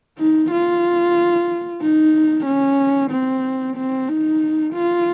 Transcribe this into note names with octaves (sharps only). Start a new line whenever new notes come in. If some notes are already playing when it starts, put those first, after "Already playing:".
D#4
F4
D#4
C#4
C4
C4
D#4
F4